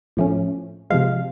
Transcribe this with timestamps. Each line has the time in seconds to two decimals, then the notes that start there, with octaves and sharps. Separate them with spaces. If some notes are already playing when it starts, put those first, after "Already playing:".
0.17 A2 F3 A3 C#4
0.90 C3 F3 G#3 F5